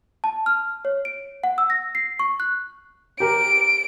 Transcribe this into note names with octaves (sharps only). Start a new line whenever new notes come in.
A5
F6
C#5
D7
F#5
E6
A#6
C7
C#6
F#6
G4 A#4 D7